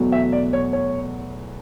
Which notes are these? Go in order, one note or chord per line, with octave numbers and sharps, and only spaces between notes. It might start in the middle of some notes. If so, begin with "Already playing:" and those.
Already playing: E2 B2 F#3 A3
E5
D5
C#5
C#5